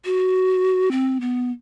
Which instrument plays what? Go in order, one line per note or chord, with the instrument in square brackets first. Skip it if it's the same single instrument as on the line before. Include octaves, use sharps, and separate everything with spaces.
[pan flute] F#4
C4
B3